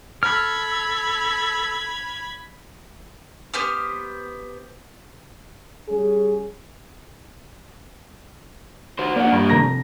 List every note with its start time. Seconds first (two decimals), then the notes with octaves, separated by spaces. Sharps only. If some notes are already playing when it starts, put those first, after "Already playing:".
0.23 A4 B5 F6 G#6
3.54 B3 G4 C5 F6
5.89 G3 C#4 G#4
8.99 F#4 C5
9.16 A#3 D4 D5 F#5
9.32 G2
9.50 F1 A#5 A#6